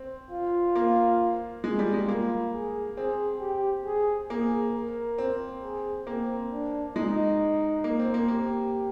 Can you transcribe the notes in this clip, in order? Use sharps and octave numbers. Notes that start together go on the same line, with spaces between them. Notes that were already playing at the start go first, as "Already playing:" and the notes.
Already playing: C4
F4
A#3
G#3 G#4
G3
G#3
A#3 F4
G#4
C4 G#4
G4
G#4
A#3 G#4
A#4
C4
G#4
A#3 C4
D4
G#3 D#4
A#3
C4
A#3
A#3 G4